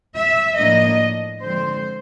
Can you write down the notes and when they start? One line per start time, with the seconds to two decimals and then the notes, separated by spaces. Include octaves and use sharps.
0.15 E5
0.58 A2 F3 A#3 D4 D#5
1.42 D3 F3 G#3 C4 C5